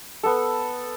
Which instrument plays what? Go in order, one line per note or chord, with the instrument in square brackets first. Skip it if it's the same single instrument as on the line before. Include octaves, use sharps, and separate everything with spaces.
[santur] B3 A4